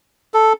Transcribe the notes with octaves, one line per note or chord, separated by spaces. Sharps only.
A4